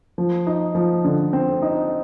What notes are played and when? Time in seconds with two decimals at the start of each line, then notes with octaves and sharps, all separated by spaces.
0.18 F3
0.47 D#4
0.75 F3
1.04 D3
1.33 C4
1.62 D#4